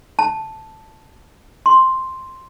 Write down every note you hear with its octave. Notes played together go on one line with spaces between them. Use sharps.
A5
C6